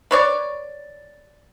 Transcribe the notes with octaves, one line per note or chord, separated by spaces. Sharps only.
B4 C#5 D5